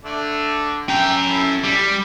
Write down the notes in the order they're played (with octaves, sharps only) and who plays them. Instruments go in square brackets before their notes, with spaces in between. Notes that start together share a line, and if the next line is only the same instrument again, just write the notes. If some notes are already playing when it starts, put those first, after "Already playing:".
[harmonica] D3 A3 D4
[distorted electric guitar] C#4 A#5 [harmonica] E5 G5
[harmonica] E4 A4
[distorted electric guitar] G3